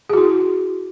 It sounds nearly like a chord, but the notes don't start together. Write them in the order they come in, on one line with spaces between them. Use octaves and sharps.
G#4 F#4 E4